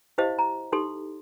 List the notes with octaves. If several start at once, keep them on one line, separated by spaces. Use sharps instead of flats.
E4 G4 C5 D#5 F5
A#5
D#4 G4 A4 C6